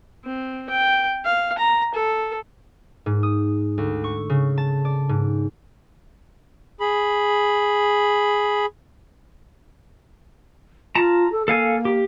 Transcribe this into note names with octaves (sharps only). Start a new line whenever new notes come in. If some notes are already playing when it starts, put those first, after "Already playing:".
C4
G5
F5
A#5
A4
G#2
D#6
D2
C#6
C#3
A5
D5
G#2
G#4 B5
F4 A5 A#5
A4
A#3 A4 F5 G#5
G4